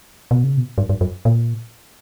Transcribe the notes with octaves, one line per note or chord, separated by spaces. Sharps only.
B2
C#3
B2
G2
G2
F#2
A#2